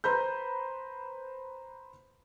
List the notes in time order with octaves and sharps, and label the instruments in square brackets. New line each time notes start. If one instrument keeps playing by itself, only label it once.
[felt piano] B4 C5 A#5 B5 G6